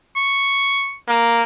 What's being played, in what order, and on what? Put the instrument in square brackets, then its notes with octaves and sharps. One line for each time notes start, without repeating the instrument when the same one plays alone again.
[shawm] C#6
[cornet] A#3